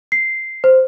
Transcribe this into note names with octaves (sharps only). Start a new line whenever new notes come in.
C7
C5